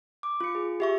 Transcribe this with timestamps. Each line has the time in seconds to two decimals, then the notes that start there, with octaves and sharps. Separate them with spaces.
0.23 D6
0.41 F4 C#7
0.55 G#4
0.80 G4 E5 C#6